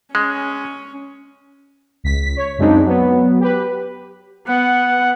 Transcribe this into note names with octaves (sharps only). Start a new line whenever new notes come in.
G#3 C#4
C#2 B6
C#5
F#2 C#3 G#3 C4 D4 D#4
F#3 B3
G4 B4
B3 F#5